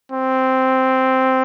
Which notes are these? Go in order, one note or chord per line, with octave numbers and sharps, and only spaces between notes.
C4